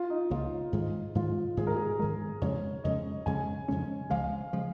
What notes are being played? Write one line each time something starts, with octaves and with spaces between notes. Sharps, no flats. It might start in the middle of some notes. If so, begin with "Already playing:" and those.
Already playing: F4
D#4
C#2 C#3 A#3 C#4 F4
G#2 D#3 G#3
G#2 D#3 G#3 F4
G#2 D#3 G#3 G#4
A#4
G#4
G#2 D#3 G#3 A#4
F2 C#3 G#3 C#4 C#5
F2 C#3 G#3 C#4 D#5
F2 C#3 G#3 C#4 G#5
F2 C#3 G#3 C#4
C#2 C#3 F3 G#3 F5
C#3 F3 G#3